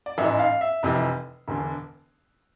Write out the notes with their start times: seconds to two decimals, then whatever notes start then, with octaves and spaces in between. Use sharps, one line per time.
0.06 D5
0.18 A1 G#2 E3 E5
0.39 F5
0.61 E5
0.83 F1 F2 C3 E3
1.48 E1 E2 D3